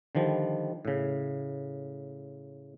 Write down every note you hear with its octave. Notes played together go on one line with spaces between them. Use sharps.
D3 D#3 F3 G3
A2 C#3